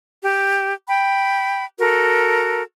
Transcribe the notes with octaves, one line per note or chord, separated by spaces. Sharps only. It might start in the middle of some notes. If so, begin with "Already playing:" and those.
G4
G5 B5
F#4 A4 A#4